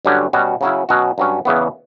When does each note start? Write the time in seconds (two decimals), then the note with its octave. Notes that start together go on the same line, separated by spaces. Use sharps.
0.05 G2 D3 F#3 C#4 G4
0.33 B2 G3 C#4 F#4
0.61 C#3 F#3 C#4 E4
0.89 B2 F#3 C#4 F#4
1.18 G2 F#3 C#4
1.45 E2 C#3 E3 B3